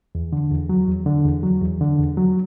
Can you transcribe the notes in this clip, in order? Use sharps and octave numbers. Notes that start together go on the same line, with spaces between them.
E2
D3
E2
F#3
E2
D3
E2
F#3
E2
D3
E2
F#3